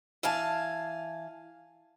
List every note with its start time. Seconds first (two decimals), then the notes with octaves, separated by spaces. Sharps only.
0.23 E3 F5 G#5 A5